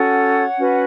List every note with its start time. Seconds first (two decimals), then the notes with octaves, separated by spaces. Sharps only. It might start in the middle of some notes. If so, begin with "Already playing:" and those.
Already playing: C#4 F#4 A4 C#5 F#5
0.57 C#4 F#4 B4